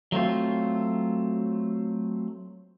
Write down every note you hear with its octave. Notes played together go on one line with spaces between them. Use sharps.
F#3 A3 C4 F4